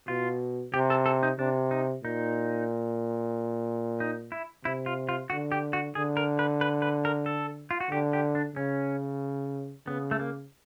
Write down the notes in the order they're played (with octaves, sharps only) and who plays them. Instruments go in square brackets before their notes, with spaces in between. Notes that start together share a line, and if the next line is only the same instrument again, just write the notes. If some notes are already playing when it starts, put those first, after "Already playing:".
[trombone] B2 [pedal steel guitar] F4
[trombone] C3 [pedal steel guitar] G4
[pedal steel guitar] A4
A4
D#4
[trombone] C3 [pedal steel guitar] D4
[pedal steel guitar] D#4
[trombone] A#2 [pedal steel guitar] D#4
[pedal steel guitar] D#4
E4
[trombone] C3 [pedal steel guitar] E4
[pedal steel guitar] F4
F4
[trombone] D3 [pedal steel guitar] F#4
[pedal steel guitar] G4
F#4
[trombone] D3 [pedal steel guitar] G#4
[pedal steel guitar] A#4
B4
B4
B4
A#4
A4
F4
F#4
[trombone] D3 [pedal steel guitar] G4
[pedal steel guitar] G4
D4
[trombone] C#3 [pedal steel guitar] C#4
[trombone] C#3 [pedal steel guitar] B3
[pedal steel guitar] A3
A#3